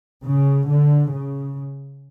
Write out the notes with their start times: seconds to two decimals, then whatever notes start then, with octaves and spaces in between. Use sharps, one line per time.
0.24 C#3
0.67 D3
1.11 C#3